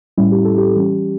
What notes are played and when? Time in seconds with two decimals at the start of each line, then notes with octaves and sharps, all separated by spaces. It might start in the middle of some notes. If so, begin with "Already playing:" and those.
0.17 A2 G3 C#4 E4
0.32 G4
0.45 A4
0.58 G4
0.75 E3 G3 C#4